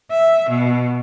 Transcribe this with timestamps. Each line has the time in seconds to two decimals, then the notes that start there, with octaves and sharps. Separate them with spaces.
0.10 E5
0.49 B2